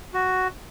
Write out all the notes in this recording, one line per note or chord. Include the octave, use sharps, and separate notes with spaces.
F#4